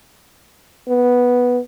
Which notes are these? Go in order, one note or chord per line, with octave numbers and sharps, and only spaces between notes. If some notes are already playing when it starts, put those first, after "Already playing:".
B3